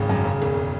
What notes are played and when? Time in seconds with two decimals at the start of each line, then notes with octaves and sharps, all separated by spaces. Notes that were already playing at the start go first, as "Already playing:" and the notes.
Already playing: G#1 C#3
0.09 F#2
0.25 C#3
0.42 E1